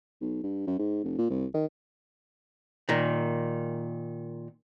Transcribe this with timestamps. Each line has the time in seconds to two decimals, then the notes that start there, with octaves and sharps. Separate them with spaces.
0.21 B1
0.43 G2
0.67 F#2
0.79 G#2
1.04 F1
1.18 A#2
1.30 C2
1.54 D#3
2.89 A#2 D#3